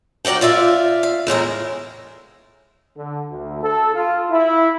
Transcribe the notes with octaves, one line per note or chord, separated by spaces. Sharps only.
F#3 A#4 D5 F#5 G5
F4 D5 E5 F5
F5
E2 A2 G#3 A#4
D3
D2
A4
F4
E4